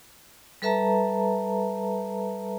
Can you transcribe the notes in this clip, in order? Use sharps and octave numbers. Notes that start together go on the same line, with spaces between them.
G3 A4 B4 E5 A5 A#5